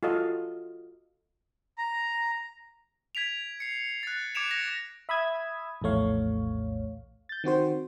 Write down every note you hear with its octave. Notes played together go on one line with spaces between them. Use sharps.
F4 F#4 A4 D#5 F5
A#5
G#6 B6 D7 F7
C7 C#7
F#6 A6
D6 G#6 C#7 D7 E7 F7
G#6 A#6
E5 B5 D#6 E6 G#6
A#1 E2 A2 A3 C#5 F5
G6 A6
D#3 C4 F#4 C5